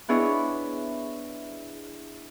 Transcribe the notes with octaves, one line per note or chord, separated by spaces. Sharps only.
B3 D4 E4 G#4 C#5 D#5